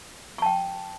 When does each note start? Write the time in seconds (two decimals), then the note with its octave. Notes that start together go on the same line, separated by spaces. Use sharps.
0.38 C#6
0.42 A5
0.46 G5